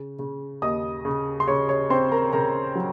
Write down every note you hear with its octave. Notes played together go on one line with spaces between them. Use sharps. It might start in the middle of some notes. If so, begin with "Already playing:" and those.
Already playing: C#3
C#3
D#2 D#5 D#6
C#3
C6
C#3 C#5 C#6
C#5 C#6
C4 C5 C6
A#4 A#5
C#3 A#4 A#5
F#3